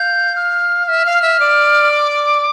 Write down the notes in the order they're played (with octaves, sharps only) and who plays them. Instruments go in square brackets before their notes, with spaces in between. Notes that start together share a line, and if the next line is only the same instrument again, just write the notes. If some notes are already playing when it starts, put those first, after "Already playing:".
Already playing: [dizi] F5 [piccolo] G6
[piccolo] F6
[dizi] E5 [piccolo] F6
[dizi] F5
[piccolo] F6
[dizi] E5
D5
[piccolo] D6